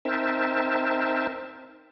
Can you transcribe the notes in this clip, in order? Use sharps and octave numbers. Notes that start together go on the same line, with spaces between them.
C4 D#4 A#4 C5 E5 A5